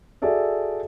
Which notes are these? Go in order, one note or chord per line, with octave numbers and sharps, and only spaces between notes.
F#4 G#4 A4 D5 E5